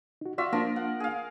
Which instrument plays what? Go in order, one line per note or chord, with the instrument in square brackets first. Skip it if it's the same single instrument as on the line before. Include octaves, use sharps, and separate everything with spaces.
[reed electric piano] D#4 F#4
[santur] F4 F#4 E5 [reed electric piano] D5
[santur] F3 A#4 C6 [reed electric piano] A#3 D4
[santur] F#5
G#4 F5